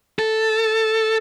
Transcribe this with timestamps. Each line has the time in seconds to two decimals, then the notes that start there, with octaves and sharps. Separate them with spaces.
0.19 A4